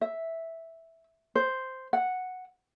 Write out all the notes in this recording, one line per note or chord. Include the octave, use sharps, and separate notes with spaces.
E5
C5
F#5